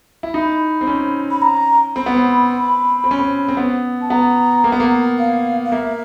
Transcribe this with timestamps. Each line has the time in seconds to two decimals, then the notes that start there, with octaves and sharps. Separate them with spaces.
0.23 E4
0.34 D#4 B5
0.81 C4
0.87 C#4
1.31 B5
1.42 A#5
1.96 C4 B5
2.06 B3
2.16 C4
3.04 C4
3.11 C#4
3.19 C4
3.48 C4
3.57 B3
4.01 A5
4.10 B3 A#5
4.64 A#3
4.72 B3
4.80 A#3
5.19 F5
5.65 F5
5.72 A#3 E5